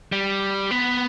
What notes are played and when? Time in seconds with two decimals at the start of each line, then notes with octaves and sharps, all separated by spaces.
0.12 G3
0.71 B3